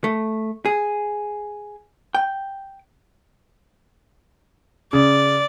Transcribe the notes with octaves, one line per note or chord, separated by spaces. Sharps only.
A3
G#4
G5
C#3 D5